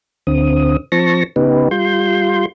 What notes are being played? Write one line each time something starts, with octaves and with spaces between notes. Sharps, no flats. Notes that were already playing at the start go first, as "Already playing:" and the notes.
D2 D3 C4 D#6
F3 C4 A5 C#6 A#6
C#3 B3 D#4 G4 B4
G3 F4 C6 G6